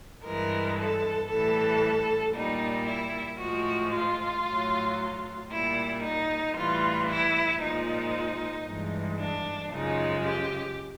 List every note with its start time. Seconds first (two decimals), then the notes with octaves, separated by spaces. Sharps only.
0.24 G2 E3 G#3 A#4
0.77 A4
1.29 A2 E3 G3 A4
2.34 A#2 G3 D#4
2.87 E4
3.40 A2 F3 G#3 F#4
3.93 F4
4.45 A2 F#3
5.50 A#2 G3 E4
6.02 D#4
6.55 A2 E3 G3 F4
7.09 E4
7.61 A#2 F3 G#3 D#4
8.65 G2 E3 G#3
9.18 D4
9.71 F#2 C#3 F3 G#3 D#4
10.24 G4